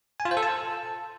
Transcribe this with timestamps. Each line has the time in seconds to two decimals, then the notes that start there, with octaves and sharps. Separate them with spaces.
0.20 G#5
0.25 F4
0.31 C5
0.37 A4
0.43 A5